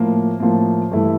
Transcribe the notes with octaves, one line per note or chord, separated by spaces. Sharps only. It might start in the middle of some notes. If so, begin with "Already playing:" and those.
Already playing: A2 F3 A#3
A2 F3 A#3
G2 E3 A3 E4